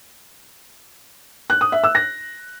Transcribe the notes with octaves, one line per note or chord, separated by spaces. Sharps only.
F#6
D#6
E5
E6
A#6